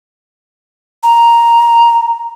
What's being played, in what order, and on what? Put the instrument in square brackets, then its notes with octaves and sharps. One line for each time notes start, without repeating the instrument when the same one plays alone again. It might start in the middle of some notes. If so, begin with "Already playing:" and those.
[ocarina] A#5